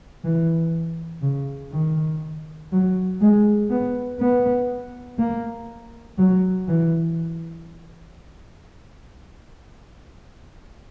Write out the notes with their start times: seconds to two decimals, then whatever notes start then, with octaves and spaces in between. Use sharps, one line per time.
0.24 E3
1.22 C#3
1.72 D#3
2.72 F#3
3.21 G#3
3.70 B3
4.20 B3
5.18 A#3
6.18 F#3
6.68 E3